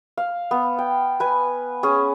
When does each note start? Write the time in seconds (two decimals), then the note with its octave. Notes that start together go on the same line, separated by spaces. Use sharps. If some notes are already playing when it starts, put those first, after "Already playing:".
0.17 F5
0.51 B3
0.79 G5
1.20 B4 G#5
1.83 C#4 G#4